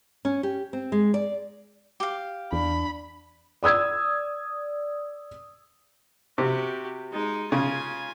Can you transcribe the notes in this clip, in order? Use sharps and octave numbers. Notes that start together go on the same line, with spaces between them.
C#4
G4
C4
G#3
D5
G4 F5
E2 D4 B5
D5 D#6 E6 G#6
C3 F#4 G4
G#3 D#4
C#3 F4 G#5